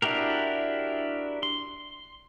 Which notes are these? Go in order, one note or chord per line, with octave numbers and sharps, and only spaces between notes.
D4 E4 F#4 G4 A#4
C6